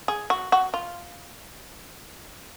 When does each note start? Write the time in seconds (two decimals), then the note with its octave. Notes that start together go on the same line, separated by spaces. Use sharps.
0.08 G#4
0.30 F#4
0.52 F#4
0.74 F4